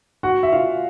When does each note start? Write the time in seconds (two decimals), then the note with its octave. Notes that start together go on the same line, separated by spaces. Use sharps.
0.23 F#4 F#5
0.43 E5
0.52 F4 F5